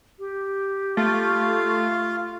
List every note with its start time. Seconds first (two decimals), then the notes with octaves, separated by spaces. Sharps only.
0.19 G4
0.97 A3 F4 F5